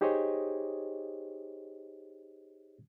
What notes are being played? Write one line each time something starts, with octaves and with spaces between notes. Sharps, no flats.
D#4 G4 G#4 C5 C#5 D#5